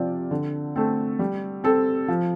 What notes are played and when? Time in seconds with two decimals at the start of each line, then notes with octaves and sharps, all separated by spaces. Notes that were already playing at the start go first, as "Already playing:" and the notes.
Already playing: C3 F3 C4 F4 D5
0.31 D3
0.76 A3 C4 A4
1.19 G3
1.64 C4 A4
2.08 F3